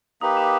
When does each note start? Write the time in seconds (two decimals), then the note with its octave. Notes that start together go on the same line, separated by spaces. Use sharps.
0.21 A#3 D#4 G4 B4 D#6
0.37 D6